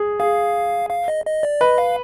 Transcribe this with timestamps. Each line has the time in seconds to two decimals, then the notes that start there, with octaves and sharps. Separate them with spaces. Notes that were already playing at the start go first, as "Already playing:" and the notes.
Already playing: G#4
0.20 G#4 F5
0.90 F5
1.08 D#5
1.26 D#5
1.43 D5
1.61 B4 D#5
1.78 F5